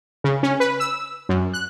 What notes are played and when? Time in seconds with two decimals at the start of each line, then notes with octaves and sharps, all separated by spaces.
0.24 C#3
0.43 C#4
0.60 B4
0.80 E6
1.29 F#2
1.54 F#6